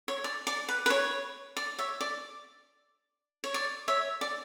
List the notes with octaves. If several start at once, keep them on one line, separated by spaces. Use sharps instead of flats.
C#5
D5
D5
B4
B4
C#5
D5
C#5 E5
D5
C#5
D5
C#5 E5
D5